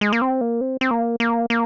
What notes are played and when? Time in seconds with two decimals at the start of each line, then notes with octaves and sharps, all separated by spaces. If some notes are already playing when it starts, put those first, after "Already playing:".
0.01 G#3
0.13 A#3
0.22 C4
0.41 A#3
0.61 C4
0.81 C4
0.91 A#3
1.20 A#3
1.50 A#3